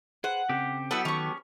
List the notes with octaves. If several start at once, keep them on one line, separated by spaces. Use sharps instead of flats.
G#4 B4 C5 F#5
C#3 C4 G4 A4
F#3 B3 E4 A4 F#5 E6
D#3 C#4 C#6